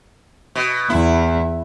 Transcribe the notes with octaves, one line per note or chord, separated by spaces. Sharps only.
B2
E2 E4